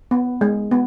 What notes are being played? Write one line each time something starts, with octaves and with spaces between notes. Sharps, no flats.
B3
G#3
B3